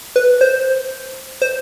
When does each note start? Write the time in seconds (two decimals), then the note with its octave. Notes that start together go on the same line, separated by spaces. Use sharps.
0.16 B4
0.41 C5
1.42 C5